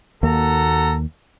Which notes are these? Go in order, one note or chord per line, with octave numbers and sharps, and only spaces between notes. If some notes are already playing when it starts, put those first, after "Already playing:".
D#2 A#3 F#4 A4 A#5